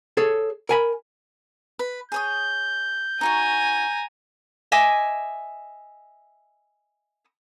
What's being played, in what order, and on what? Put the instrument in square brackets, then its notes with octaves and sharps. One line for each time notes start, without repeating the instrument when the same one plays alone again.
[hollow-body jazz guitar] G#4 A4 C#5
A#4 G#5 B5
[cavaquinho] B4
[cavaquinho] G#4 C#5 D#6 [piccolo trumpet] G6
[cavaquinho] D#4 F#4 C#6 [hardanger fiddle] G#5 A#5
[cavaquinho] D#5 E5 G#5 D6